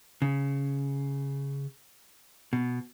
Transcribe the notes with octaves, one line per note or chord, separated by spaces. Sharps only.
C#3
B2